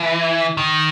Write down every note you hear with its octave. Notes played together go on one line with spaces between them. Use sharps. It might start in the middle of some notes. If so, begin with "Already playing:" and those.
Already playing: E3
D#3